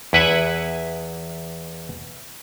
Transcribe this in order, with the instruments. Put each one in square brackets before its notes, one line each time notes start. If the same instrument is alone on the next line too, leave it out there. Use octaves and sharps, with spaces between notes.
[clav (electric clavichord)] E2 E4 B4 E5 F#5 G#5